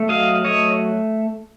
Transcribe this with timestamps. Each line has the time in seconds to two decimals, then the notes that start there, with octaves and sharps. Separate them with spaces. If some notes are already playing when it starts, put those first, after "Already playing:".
Already playing: A3
0.09 F#3 D#5 F5
0.44 A3 C#5 D#5